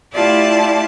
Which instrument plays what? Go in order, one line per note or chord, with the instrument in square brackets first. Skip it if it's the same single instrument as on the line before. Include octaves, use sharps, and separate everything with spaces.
[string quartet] A3 E4 F4 G4 D5 A5